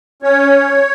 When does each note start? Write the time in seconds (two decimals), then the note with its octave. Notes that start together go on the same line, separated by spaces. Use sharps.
0.22 C#4 C#5